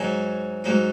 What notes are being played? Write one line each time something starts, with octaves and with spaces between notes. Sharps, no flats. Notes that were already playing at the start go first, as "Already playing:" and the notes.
Already playing: G#2 F#3 D#4 G#4 G#5
G#2 F#3 D#4